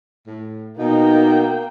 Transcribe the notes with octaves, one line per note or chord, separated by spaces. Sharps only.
A2
B2 A#3 D#4 G5